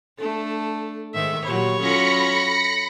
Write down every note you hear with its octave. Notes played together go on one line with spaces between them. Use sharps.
A3 D4 A4
G#2 D#3 E5
A#2 F#3 G4 C#5 B5
F#3 C#4 F4 A4 B5 A#6 C#7